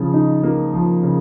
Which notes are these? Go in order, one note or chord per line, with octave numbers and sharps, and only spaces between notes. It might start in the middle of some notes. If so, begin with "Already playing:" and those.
Already playing: C#3 F3
D#4
A#3
F3
C#3